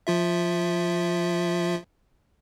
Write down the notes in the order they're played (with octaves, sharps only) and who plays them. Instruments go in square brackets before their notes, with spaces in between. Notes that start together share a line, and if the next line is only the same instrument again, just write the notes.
[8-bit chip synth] F3 F4 E5